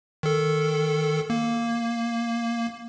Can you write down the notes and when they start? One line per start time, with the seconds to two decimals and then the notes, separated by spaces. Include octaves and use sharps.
0.23 D#3 A4
1.30 A#3